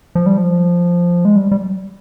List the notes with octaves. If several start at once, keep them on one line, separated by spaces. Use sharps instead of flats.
F3
G3
F3
G#3
G3
G3